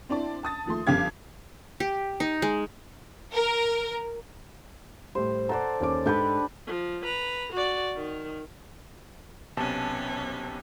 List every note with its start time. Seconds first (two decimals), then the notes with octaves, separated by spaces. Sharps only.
0.09 C4 D4 E4 D5
0.43 A5 D#6 A6
0.66 D#2 F3 A3 C6
0.87 G1 F2 G4 F5 D6 G#6
1.80 G4
2.20 D#4
2.42 G#3
3.34 A#4
5.15 A2 G3 C5
5.49 A4 C5 D5 F#5 A#5
5.80 D#2 C#4 D6
6.06 G#2 D4 G4 A4 B4 G6
6.67 F3
7.04 B4 A#5
7.52 F#4 D5
7.96 D#3
9.57 B1 C3 B3 C#4 A5